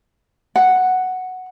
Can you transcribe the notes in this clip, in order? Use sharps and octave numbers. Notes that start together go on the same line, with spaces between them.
F#5